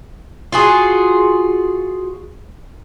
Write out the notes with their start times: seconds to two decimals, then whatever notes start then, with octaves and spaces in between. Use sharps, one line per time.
0.52 F4 F#4 G#4